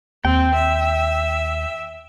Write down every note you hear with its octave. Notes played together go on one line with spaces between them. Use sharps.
D#2 C4 G5
E5